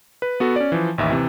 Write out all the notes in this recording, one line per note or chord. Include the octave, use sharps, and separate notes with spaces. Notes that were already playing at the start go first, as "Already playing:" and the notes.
B4
B3 F#4 A4
C#4 D5
E3 F3
A1 D#2 E5
C3 E3